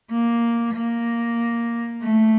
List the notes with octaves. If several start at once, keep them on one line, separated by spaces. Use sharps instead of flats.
A#3
A#3
A3